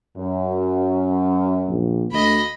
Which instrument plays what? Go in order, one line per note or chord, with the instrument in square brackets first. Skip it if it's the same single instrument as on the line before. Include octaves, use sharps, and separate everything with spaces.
[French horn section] F#2
[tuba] A#1
[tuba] D2 [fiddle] D#5 B5